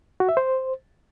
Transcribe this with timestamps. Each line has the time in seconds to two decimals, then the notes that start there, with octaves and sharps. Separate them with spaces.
0.20 F#4
0.29 E5
0.37 C5